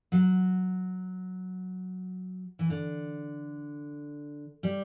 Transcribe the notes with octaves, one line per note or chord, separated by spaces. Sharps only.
F#3
E3
D3
G3